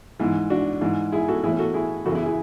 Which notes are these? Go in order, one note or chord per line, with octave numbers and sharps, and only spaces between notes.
G#2 E3
D4 F#4
G#2 E3
E4 G#4
F#4 A4
A2 E3 E4 G#4
F#4 A4
E4 G#4
F#2 C#3 E3 F#4 A4
E4 G#4
E4 G#4